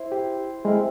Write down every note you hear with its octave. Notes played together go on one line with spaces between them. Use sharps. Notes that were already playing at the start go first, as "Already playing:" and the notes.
Already playing: E4 C5
G4
G#3 C4 E4 A#4 F5